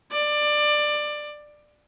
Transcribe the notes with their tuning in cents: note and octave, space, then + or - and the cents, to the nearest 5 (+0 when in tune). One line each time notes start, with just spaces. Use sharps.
D5 +20